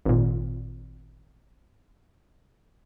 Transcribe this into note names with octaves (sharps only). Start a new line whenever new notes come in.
G#1 A#2